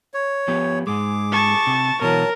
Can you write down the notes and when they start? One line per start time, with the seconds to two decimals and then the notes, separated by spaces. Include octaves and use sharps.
0.14 C#5
0.48 F3 B3 G4
0.87 G#2 G#3 G#4 D6
1.32 A5 C#6
1.67 C3
2.01 B2 E3 F#3 A#4 A5